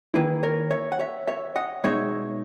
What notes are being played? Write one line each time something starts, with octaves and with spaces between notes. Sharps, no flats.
D#3 A#3 E4 G#4 B4
A#4 C#5
C#5 E5
F#5
C#5 E5
C#5 E5
D#5 F#5
B2 G#3 D#4 C#5 E5